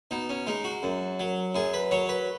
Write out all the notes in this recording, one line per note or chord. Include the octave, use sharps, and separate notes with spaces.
B2 D#4
C#4
G#3 D#4
F#4
F#2
F#3
F#2 G#4
B4
F#3 C#5
B4